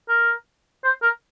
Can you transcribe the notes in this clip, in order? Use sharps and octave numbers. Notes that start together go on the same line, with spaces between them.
A#4
C5
A#4